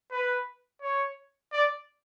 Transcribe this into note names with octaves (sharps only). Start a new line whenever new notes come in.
B4
C#5
D5